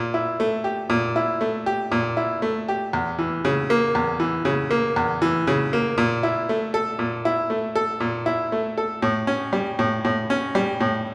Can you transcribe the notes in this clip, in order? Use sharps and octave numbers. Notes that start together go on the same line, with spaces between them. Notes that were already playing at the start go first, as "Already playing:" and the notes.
Already playing: A#2
E4
A3
G4
A#2
E4
A3
G4
A#2
E4
A3
G4
E2
E3
C#3
A#3
E2
E3
C#3
A#3
E2
E3
C#3
A#3
A#2
E4
A3
A4
A#2
E4
A3
A4
A#2
E4
A3
A4
A2
C#4
G3
A2
A2
C#4
G3
A2